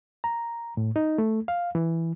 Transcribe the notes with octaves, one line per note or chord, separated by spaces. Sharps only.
A#5
A2
D#4
A3
F5
E3